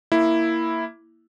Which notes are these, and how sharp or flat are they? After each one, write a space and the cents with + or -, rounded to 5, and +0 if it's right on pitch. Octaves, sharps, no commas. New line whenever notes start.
A#3 +0 E4 +0